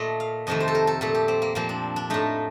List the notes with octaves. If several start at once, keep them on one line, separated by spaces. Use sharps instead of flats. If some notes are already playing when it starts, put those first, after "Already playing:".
Already playing: A#2 A3 D#5
F5
F2 C3 D#3 A3 D#5
C5
A4
A#4
A4
A#2 A3 A4
G4
C4
A#3
A#2 F3 A#3 C4
D4
D4
A2 A3 D#4